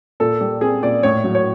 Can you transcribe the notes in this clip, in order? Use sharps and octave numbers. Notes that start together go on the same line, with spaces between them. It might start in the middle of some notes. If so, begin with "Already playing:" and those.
A#2 A4
G3
C4 G#4
A#2 D5
A2 C#5
F#3
C#5